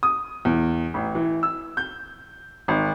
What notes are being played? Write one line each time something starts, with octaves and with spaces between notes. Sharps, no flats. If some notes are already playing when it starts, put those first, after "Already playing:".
D#6
E2
A1
E3
E6
G6
G#1